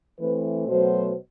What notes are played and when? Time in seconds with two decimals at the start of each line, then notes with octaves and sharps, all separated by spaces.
0.20 E3 A3 C4 B4
0.68 B2 F#3 A3 C5